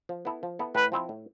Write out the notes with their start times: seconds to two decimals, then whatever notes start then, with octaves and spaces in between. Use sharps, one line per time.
0.09 F3
0.25 B3 E4 A4
0.43 F3
0.59 B3 E4 A4
0.75 A2 B4
0.92 F3 C4 E4
1.09 A2